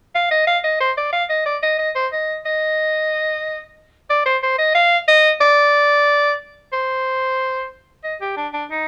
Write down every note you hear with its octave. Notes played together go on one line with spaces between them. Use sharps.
F5
D#5
F5
D#5
C5
D5
F5
D#5
D5
D#5
D#5
C5
D#5
D#5
D5
C5
C5
D#5
F5
D#5
D5
C5
D#5
G4
D4
D4
D#4